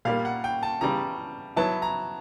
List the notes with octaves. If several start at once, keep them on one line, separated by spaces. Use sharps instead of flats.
A#2 G3 A#3 F5
F#5
G5
A5
C#3 E3 G3 A#5
F#3 B3 E4 A5
A#5